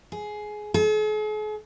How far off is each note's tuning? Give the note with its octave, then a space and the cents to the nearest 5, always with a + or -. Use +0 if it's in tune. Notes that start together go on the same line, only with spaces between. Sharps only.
G#4 +15
G#4 +45